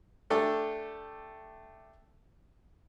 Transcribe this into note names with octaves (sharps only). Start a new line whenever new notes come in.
A3 D4 G4 A4